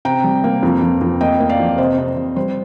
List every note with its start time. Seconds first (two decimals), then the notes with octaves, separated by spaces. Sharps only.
0.05 C3 G5 A#5
0.24 G3
0.44 A#3
0.63 F2
0.82 F2
1.01 F2
1.21 A#3 D#5 G5
1.40 A#3
1.49 D5 F5
1.60 F2
1.78 C3 C5 D#5
1.98 C3
2.17 C3
2.36 G3 C5